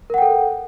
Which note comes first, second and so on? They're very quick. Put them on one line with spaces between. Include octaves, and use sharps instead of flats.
A#4 F#5 G5 A4